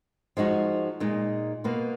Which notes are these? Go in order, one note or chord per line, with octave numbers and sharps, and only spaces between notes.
F3 G#3 D#4 F#4
A#2 G#3 D#4
B2 A#3 F4 B4